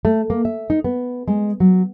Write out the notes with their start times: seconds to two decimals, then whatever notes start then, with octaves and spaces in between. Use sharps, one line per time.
0.05 A3
0.30 A#3
0.45 E5
0.70 D#4
0.84 B3
1.28 G#3
1.60 F#3